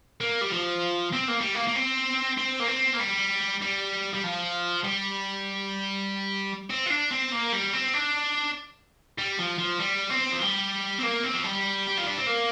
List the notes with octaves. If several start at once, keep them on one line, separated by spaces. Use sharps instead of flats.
A#3
G3
F3
C4
A#3
G3
A#3
A#3
C4
C4
A#3
C4
A#3
G3
G3
G3
F3
G3
C4
F4
D4
C4
A#3
G3
C4
D4
G3
F3
F3
G3
C4
F3
G3
C4
A#3
C4
F3
G3
G4
F4
D4
C4
A#3